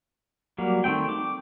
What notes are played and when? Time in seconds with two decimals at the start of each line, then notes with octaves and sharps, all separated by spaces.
0.58 F#3 G3 A#3
0.84 D#3 A3 C4 G5
1.09 D6